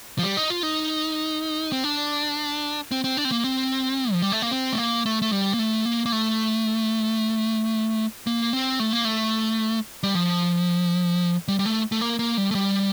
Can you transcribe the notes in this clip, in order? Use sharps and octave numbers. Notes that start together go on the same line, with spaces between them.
F3
G3
D#4
F4
D#4
C4
D4
C4
C4
D4
C4
A#3
C4
F3
G3
A3
A#3
C4
A3
A#3
A3
A3
G3
A#3
A3
A#3
A#3
A3
A#3
C4
A3
A#3
A3
G3
F3
G3
G3
A3
A3
A#3
A#3
G3
A3
G3